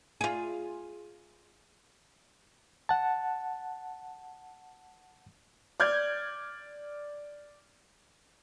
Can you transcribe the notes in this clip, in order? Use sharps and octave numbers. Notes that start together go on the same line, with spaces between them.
F4 G#4
F#5 A5
D5 F6 G6 G#6